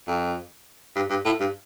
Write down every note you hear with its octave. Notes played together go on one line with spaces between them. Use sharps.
F2
G2
G2
A2
G2